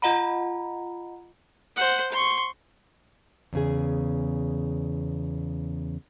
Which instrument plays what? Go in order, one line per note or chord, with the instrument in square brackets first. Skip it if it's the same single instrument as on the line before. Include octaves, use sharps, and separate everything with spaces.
[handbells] F4 D#5 F#5 A#5 B5
[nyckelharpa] C5 F#5
C6 C#6
[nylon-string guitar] E2 C#3 G#4